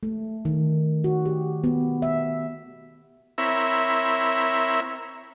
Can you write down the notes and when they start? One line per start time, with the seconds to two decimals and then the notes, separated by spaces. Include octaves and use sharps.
0.03 A3
0.45 D#3
1.04 F#4
1.25 G4
1.64 B3
2.02 E5
3.38 C4 E4 A#4 C#5 E5 B5